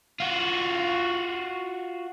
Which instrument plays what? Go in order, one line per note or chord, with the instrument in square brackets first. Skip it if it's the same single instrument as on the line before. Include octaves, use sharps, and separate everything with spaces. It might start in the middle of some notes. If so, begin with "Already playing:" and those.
[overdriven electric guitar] F4 F#4